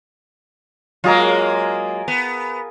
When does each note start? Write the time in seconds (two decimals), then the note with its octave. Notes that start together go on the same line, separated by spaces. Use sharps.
1.04 F#3 G#3 A#3 F4 G#4 A#4
2.08 B3